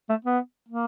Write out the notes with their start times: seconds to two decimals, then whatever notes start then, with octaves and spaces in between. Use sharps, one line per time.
0.09 A3
0.25 B3
0.68 A#3